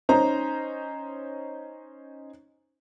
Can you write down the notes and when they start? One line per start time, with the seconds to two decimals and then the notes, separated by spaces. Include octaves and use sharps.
0.09 C#4 D#4 C5 A#5